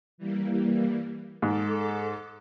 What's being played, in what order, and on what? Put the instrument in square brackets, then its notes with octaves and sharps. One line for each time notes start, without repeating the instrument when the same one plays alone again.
[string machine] E3 G3 A#3
[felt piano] G#2 [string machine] A4 D6